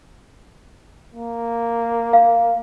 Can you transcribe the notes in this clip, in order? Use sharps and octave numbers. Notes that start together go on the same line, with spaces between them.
A#3
F5